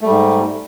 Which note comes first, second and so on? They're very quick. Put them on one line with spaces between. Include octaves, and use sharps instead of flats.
A3 G3 G#2